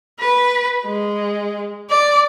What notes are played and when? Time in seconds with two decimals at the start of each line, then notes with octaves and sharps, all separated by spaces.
0.20 B4
0.85 G#3
1.90 D5